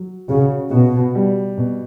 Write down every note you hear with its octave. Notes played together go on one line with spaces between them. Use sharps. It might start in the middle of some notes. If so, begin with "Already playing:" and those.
Already playing: F#3
C#3 F#4
B2 F#4
G3
B2